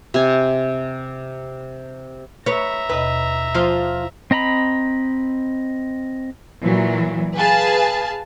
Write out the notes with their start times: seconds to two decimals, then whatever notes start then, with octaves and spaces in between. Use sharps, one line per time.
0.14 C3 G#5
2.46 B4 C#5 E5 A#5
2.89 D#2 B2 B4 D#5
3.55 F3 F4 C5
4.31 C4 D#5 A#5 B5
6.64 A#2 E3 F#3
7.35 G#4 B4 F5 G#5 A5